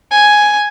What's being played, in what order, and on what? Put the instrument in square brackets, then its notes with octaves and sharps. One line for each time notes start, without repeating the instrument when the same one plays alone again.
[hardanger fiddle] G#5